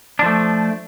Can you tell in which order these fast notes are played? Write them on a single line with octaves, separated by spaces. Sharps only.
D4 F3 A3